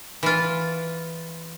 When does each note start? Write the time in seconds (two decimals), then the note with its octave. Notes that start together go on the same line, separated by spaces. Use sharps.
0.23 E3 F4